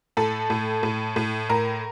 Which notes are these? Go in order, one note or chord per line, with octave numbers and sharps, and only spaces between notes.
A2 A4
A2
A2
A2
A2 A#4